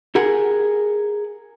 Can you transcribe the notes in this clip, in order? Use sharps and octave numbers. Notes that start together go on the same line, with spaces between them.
G4 G#4 A#4 F#5